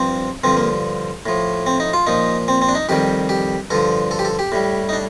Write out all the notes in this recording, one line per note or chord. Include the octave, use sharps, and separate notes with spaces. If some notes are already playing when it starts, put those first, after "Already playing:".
Already playing: G2 F3 C4
G2 D3 F3 C4
A#3
A2 F3
C4
D#4
F4
A#2 F3 D#4
C4
C4
D4
D#4
F2 D#3 G3 G4
G4
G2 D3 F3 A4
A4
G4
A4
G4
A2 G3
D#4
D4